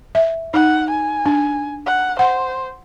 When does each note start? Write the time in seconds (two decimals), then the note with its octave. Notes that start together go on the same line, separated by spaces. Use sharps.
0.15 E5
0.54 D#4 F#5
0.90 G#5
1.26 D4
1.86 F#5
2.19 C5 F#5